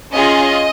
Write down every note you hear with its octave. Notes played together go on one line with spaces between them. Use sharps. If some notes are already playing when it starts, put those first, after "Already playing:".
C#4 F4 G#4 D#5